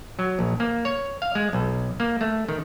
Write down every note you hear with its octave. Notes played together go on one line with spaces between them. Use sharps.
F#3
A#1
A#3
C#5
F5
G#3
B1
A#3
A3
D#3